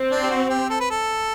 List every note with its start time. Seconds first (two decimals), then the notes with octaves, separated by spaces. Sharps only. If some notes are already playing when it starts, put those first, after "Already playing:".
Already playing: C4
0.11 D4
0.23 G4
0.30 F#4
0.50 G4
0.70 A4
0.80 B4
0.90 A4